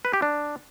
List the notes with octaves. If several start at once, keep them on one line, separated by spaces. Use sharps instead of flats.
B4
G4
D4